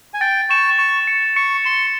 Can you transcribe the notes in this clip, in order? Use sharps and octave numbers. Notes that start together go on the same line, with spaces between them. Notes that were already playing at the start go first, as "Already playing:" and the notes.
G#5
G5 A6
C#6 E7
C#6 E7
C#7
C#6 C#7
C6 E7